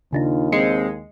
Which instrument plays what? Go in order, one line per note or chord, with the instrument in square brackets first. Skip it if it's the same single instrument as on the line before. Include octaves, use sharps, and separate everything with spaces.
[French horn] D#2 [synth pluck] C#3 D4 D#4 [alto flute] F4
[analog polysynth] G#3 [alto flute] C4 [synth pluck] D#5 C7 C#7